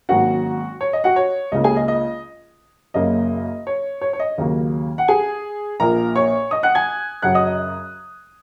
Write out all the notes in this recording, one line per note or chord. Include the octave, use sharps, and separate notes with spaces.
G#1 G#2 F#3 A#3 C#4 F#4 F#5
C#5
D#5
F#4 F#5
C#5
C#2 C#3 A#3 D#5
G#4 G#5
D#5
D#5
F#1 F#2 C#3 A#3 C#4 D#5
C#5
C#5
C#5
D#5
D#2 C#3 F#3 A#3
F#5
G#4 G#5
A#1 A#2 A#3 A#4 A#5
C#5 C#6
D#5 D#6
F#5 F#6
G#5 G#6
F#2 C#3 F#3 C#4 F#5 F#6
D#5 D#6
D#5